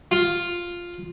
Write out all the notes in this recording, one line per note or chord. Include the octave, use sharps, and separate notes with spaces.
F4